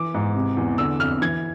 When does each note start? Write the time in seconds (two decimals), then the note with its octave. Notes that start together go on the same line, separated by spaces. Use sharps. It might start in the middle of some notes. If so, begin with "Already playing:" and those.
Already playing: E3 D6
0.14 G#2
0.36 C3
0.57 E2
0.78 D3 E6
0.99 F2 F6
1.22 E3 G#6